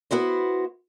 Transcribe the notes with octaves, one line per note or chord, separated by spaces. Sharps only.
B3 E4 F#4 C5